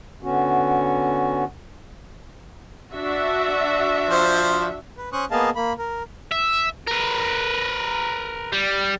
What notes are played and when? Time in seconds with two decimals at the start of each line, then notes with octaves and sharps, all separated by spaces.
0.23 D3 B3 C#4 F#4
2.94 D4 F#4 E5
4.09 F3 C5
4.98 B4
5.13 C#4 C5 C#6 D#6 F#6
5.31 A#3 B3 G#4 D#5 F5 A5
5.55 A#3 B5
5.79 A#4
6.32 E5
6.88 A#4 B4
8.53 G3